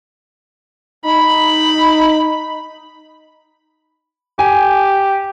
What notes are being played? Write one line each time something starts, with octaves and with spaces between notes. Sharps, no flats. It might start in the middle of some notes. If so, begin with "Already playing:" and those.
D#4 B5
G4 G#5